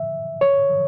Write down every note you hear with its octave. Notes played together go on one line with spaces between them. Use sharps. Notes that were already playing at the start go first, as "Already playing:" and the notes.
Already playing: E5
C#5